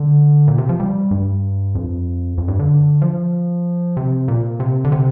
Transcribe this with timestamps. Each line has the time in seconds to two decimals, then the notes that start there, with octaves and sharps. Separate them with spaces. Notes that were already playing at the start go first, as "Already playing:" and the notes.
Already playing: D3
0.48 A#2
0.58 C3
0.69 F3
0.80 G3
1.11 G2
1.75 F2
2.38 F2
2.48 G2
2.59 D3
3.02 F3
3.97 C3
4.28 A#2
4.60 C3
4.85 D3
4.92 C3